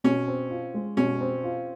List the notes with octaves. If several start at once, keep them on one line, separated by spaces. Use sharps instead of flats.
B2 C#4
C4
F4
G#3
B2 C#4
C4
F4